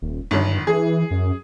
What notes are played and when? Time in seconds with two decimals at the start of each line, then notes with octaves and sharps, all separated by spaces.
0.02 D#1
0.31 G1 G2 D#3 F#3
0.67 E3 G#4
1.11 F#2